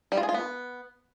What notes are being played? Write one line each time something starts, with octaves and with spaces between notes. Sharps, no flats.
G3
F4
G#4
F4
B3